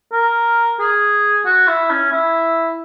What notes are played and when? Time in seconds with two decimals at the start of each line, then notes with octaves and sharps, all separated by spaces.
0.12 A#4
0.79 G#4
1.45 F#4
1.67 E4
1.90 C#4
2.11 E4